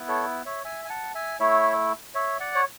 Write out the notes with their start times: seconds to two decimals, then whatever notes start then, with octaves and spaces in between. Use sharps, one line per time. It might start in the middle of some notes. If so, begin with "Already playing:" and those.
Already playing: B3 E4
0.08 A4 C#5
0.45 C#5 E5
0.64 E5 G#5
0.85 G#5
0.89 F#5 A5
1.15 E5 G#5
1.40 A3 E4 C#5 E5
2.15 C#5 E5
2.40 D5 F#5
2.55 C#5